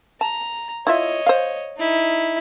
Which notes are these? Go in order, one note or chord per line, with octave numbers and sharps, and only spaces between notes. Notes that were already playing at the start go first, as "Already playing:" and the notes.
A5 A#5
E4 F4 C#5 D#5 E5
C5 F5
D#4 E4